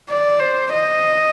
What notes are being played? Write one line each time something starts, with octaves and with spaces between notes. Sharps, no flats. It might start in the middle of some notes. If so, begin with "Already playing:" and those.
D5
C5
D#5